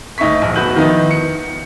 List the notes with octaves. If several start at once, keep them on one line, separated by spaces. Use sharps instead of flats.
D2 D#4 E5 C#6 B6
A#1
D1 B3 F#4 B4 G6 F#7
D#3 F3 B3 D#4 E4
C#7